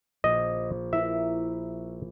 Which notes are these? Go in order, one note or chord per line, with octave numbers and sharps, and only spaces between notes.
A#1 D#5
E4 A#4 E5